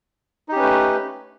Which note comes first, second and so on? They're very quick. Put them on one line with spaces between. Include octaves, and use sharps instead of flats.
D#4 G4 C#4 B4 A3